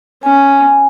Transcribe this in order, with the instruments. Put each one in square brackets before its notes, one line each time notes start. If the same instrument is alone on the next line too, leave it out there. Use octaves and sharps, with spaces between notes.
[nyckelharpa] C#4 [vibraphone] G#5